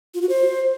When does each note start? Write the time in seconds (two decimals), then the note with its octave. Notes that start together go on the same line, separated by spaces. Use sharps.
0.14 F4
0.22 F#4
0.29 C5